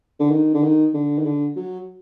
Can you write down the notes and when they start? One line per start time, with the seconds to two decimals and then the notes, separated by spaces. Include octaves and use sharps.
0.20 D3
0.31 D#3
0.54 D3
0.63 D#3
0.94 D3
1.18 D#3
1.25 D3
1.56 F#3